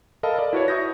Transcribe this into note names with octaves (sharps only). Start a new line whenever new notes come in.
A4 A#4 D#5 F5 A5 B5
D5
E4 F#4 B4 C#5
E5 C#6 D#6 G6 A#6